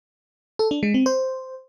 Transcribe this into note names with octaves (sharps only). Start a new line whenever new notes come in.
A4
D4
G#3
C4
C5